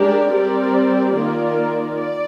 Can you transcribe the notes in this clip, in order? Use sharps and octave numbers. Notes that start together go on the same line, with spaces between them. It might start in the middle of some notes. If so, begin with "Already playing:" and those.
Already playing: G#3 D4 G4 A#4 D5
G3 C4 G4 A#4 D5
D#3 A#3 F4 A#4 D5
D5